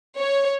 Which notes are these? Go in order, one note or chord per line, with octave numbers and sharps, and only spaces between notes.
C#5